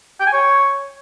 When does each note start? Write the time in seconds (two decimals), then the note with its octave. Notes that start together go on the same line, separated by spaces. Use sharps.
0.20 G5
0.27 G#5
0.33 C#5